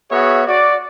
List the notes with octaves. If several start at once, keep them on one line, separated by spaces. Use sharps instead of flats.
B3 F#4 G#4 C#5 E5
F#4 D5